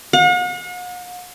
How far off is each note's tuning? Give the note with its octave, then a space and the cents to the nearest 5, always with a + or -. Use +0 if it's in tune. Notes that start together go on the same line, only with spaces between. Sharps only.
F#5 -45